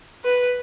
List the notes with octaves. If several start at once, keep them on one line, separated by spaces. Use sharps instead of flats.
B4